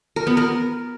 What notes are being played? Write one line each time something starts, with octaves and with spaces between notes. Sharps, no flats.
A#4
B3
A#4